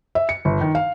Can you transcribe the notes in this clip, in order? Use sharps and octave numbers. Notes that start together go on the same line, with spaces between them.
E5
C#7
G1
D#3
F5